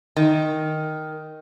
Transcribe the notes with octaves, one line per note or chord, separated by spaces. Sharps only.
D#3